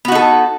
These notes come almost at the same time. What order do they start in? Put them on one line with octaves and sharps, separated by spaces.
B3 F#4 D#4 A4